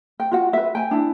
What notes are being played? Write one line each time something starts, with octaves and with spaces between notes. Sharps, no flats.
G5
F4 F#4 F#5
B4 E5
G5 G#5
D4 E4